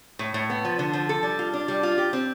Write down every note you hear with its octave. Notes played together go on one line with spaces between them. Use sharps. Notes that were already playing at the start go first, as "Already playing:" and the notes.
A2
A2
B3
F3
D3
F3
A4
G3
F4
D4
G3
F4
G4
C4